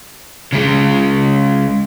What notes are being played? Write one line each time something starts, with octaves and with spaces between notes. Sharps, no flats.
C#3 G#3